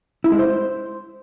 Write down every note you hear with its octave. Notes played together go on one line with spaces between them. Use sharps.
E4
G#3
C5